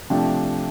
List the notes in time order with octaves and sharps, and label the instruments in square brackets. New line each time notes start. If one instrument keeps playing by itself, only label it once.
[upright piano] C3 F3 A3 D4